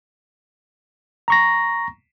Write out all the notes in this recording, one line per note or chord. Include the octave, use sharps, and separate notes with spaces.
A#5 C#6 A#6